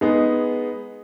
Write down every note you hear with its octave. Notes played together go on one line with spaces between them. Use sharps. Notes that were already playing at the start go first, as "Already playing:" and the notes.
G#3 B3 D#4 G#4